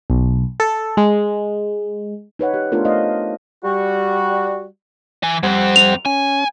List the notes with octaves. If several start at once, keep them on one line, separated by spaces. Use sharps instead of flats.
B1
A4
G#3
D#4 B4 C#5 F#5
G4
A3 B3 D4 F4 A4 A#4
A3 D#4 C5 C#5 D#5 F5
G3 F#4
E3 G#5
F2 G3 C4 C5 F#5
F7
C#4 G#5